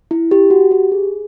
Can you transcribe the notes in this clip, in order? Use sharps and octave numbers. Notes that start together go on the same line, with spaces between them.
E4
G4
F#4
G4
G#4